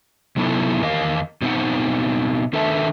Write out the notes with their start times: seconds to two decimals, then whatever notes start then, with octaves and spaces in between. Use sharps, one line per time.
0.36 C3 F#3 B3 D#4 E4 A4
0.81 E2 D#3 A#4 D#5 F5
1.42 B2 E3 C4 D#4 F#5
2.53 D#3 D4 A4 B4 E5 A5